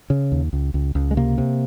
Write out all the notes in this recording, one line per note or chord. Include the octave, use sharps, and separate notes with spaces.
C#3
D#2
C#2
C#2
C#2
G#3
C3 A#3
C3